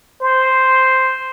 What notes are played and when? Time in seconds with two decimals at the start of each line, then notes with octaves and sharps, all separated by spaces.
0.21 C5